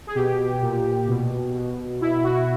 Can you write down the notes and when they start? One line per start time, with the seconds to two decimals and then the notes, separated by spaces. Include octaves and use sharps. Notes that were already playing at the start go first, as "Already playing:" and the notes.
0.07 G#4
0.15 B2 G4
0.62 A#2
1.08 B2
1.54 B2
2.00 B2 E4
2.24 F#4